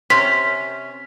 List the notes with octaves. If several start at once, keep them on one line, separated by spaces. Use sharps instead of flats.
C3 C#4 C6 B6